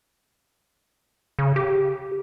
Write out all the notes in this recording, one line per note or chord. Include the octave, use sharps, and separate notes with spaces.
C#3
G4